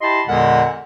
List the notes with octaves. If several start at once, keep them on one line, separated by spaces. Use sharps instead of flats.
E4 G4 D#5 A5 B5 C6
E2 A#2 D3 G#3 A#4 F#5